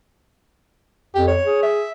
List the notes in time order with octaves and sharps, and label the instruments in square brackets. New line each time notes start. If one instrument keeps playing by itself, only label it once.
[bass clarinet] F2 [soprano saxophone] G4
[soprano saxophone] C#5
[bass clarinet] G#4
[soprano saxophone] E5